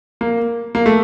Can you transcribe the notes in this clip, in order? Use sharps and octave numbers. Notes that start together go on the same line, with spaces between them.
A#3
A#3
A3